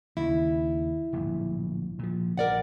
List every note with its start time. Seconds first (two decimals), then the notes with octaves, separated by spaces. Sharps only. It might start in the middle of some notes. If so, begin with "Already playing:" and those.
0.17 D#2 C#3 E4
1.13 D1 A#1 G2
1.99 A#2 F3
2.38 A#1 A#4 D5 F#5